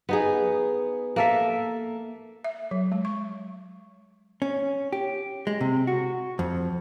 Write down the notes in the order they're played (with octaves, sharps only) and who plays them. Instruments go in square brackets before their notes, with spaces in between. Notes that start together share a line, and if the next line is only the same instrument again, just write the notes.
[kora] B3 D#4 G#4
A#3 A4 E5
[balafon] E5
F#3
G#3
C#6
[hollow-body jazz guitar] C#4
G4
G#3
C3
F#4
F2